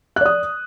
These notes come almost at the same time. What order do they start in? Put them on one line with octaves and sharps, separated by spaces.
F#6 D5 D#6